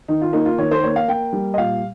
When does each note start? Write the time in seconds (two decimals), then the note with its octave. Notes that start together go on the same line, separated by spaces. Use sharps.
0.08 D#3 D#4
0.22 F4
0.33 A#3 D#4
0.45 F4
0.58 D#3 C#5
0.71 C5
0.84 A#3 C#5
0.96 F5
1.08 A#3 G5
1.33 G3
1.54 D#5
1.58 A#2 F5